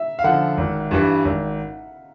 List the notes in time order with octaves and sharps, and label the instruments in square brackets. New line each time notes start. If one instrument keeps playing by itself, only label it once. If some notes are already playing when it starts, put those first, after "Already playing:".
Already playing: [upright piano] E5
F5
[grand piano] D3 F3 [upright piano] F#5
[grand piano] G#1
G2 E3 G3
G#1